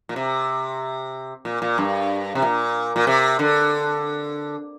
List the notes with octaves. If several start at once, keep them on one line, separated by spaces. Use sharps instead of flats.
A#2
C3
A#2
A#2
G2
C3
A#2
A#2
C3
D3